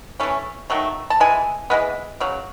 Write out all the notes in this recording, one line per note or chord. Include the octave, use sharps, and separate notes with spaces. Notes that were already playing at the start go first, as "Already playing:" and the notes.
E3 A3 C#4
D#3 F#3 A3
A5
E3 G#3 G#5
E3 G#3 B3
C#3 F#3